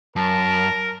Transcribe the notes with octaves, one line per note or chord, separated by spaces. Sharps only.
F#2 A#4 A5